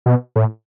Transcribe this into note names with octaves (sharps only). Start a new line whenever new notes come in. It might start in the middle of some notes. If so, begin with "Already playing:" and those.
B2
A2